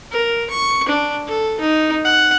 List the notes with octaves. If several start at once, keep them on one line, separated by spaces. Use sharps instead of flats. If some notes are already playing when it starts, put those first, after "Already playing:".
A#4
C#6
D4
A4
D#4
F#5